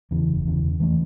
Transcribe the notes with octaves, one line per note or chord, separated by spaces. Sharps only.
E2 C#3 E3
F#1
E2 C#3 E3
E2
E3 A3 C#4